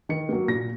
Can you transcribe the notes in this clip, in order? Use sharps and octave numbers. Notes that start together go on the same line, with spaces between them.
D#3 C#7
F#3 A#3
A#2 A#6